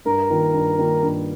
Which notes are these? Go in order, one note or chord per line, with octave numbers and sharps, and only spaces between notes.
G2 A#4
D#3 A#3 F4
G2
D#3 A#3 F4
G2